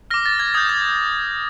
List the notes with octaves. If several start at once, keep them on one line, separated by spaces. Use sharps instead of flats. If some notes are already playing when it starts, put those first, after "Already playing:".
D6 F6 A#6
A6
G#6
D#6 G6 G#6
A6